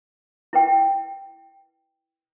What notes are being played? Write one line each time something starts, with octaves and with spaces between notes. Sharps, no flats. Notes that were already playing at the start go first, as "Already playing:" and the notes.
E4 B4 G5